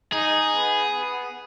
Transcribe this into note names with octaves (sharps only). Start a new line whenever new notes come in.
D#4 G#4
B3
B3